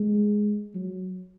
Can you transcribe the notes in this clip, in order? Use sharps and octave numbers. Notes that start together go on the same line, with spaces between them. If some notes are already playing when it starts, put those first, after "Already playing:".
Already playing: G#3
F#3